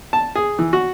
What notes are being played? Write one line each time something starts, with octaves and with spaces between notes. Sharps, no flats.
A5
G#4
E3
F#4